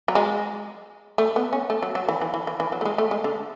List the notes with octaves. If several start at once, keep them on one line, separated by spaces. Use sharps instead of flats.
F#3
G#3
A3
B3
C#4
A3
F#3
F#3
E3
E3
E3
E3
E3
F#3
A3
G#3
A3
G#3
D3